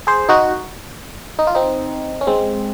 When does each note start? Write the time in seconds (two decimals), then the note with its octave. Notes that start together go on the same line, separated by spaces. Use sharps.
0.07 G#4 C5
0.29 D#4 F#4
1.39 D#4
1.47 F4
1.55 C4 D#4
2.21 C#4
2.27 G#3 C4